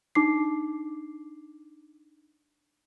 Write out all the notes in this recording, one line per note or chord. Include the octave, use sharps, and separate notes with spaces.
D4 D#4 D6 C7